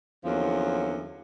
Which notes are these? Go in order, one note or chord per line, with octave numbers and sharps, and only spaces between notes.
E2 D3 F3 F#3 A#3 C#4